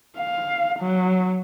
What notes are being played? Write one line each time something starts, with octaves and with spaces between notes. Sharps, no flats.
F5
F#3